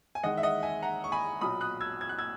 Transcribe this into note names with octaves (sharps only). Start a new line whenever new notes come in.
G#5
E2 D#3 G#3 D#5 F#5
E5
D#5 F#5
E5 G#5
F#5 A#5
C#6
G#5 B5
B1 A#2 F#3 B5 D#6
D#6 F#6
E6 G#6
G#6
F#6
E6 G#6